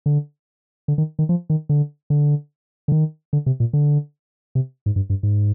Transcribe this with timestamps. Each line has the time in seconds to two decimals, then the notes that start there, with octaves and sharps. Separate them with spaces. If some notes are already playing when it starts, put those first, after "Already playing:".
0.06 D3
0.88 D3
0.98 D#3
1.19 D#3
1.29 F3
1.50 D#3
1.69 D3
2.10 D3
2.88 D3
2.92 D#3
3.33 D3
3.46 C3
3.60 A#2
3.73 D3
4.55 C3
4.86 G#2
4.96 G2
5.10 G2
5.23 G#2